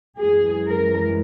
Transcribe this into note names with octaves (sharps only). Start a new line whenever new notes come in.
F#2 E3 G#3 G#4
A#4